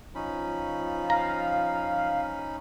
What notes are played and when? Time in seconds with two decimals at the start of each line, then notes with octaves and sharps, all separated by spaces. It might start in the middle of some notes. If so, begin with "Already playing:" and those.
0.15 F3 C#4 D#4 B5
1.10 F5 A#5